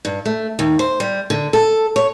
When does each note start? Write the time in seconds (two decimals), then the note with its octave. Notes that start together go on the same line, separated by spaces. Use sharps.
0.05 G2
0.26 A3
0.59 D#2
0.79 C5
1.00 G3
1.30 D3
1.53 A4
1.96 C#5